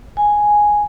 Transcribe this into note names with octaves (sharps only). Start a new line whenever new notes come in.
G#5